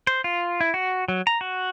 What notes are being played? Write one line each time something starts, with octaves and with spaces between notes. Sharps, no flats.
C5
F4
E4
F#4
F#3
A#5
F#4